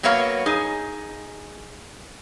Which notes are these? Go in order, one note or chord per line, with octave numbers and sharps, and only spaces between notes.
F#3 A#3 B3 C#5 F5
D#4 G#4